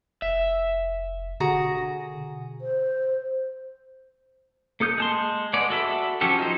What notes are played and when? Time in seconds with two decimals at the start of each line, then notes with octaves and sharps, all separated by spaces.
0.22 F1 E5
1.40 B2 D3 F#4 G#4 A#5
2.61 C5
4.80 A#3 A4 D#6 G6
4.98 G#3 A5 C6
5.53 G#3 B3 D5
5.70 F#4 A4 E5 B5
6.21 F3 F#3 C#4 G4 A4
6.39 D#4 C5